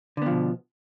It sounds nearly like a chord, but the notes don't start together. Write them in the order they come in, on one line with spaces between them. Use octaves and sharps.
D3 B3 F3 B2